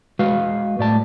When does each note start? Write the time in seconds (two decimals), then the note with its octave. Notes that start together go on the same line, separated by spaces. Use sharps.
0.19 G#3 F#4 B4 F5
0.79 A2 D5 A5